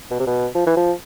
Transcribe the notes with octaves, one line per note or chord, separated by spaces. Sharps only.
B2
C3
B2
F3
E3
F3